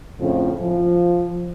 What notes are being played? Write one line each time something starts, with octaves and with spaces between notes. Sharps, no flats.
F2 A2 C#3 F3
F3